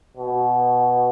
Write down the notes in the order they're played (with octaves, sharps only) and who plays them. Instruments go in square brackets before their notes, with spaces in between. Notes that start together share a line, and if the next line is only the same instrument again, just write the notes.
[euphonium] B2